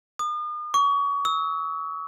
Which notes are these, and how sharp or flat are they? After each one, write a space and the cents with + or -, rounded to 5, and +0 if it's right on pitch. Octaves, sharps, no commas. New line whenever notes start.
D#6 -40
C#6 +30
E6 -40